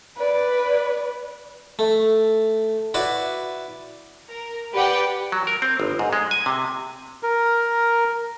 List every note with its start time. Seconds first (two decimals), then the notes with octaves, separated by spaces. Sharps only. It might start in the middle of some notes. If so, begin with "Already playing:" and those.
0.17 B4 D5
1.79 A3
2.94 E4 F#4 B4 D5
4.29 A#4
4.73 G4 B4 D5 F#5 G5
5.32 F#3
5.47 A#4
5.62 C4
5.80 G1
5.99 G#2
6.13 G#3
6.31 G#5
6.46 C3
7.23 A#4